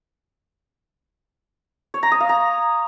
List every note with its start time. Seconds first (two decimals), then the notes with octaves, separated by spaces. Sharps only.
1.94 C#5
2.03 A#5
2.12 D#6
2.20 F5
2.29 A#5